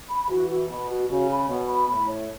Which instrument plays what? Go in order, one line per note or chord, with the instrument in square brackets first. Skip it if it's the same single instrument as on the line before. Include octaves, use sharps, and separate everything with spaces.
[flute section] B5
[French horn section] E3 [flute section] F#4
[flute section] F#4
[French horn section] B2 [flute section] B5
[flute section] F#4
[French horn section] C#3 [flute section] F#4
[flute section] B5
[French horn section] B2 [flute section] C#5
[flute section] B5
[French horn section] A2 [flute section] B5
[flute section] C#5